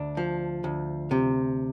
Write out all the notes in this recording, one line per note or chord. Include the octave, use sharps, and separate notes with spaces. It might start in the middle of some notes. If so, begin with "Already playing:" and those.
Already playing: D2 D4
F3
D2
C3